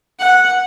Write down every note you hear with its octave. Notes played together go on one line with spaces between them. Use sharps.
F#5